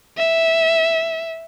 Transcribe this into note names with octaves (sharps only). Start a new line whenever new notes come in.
E5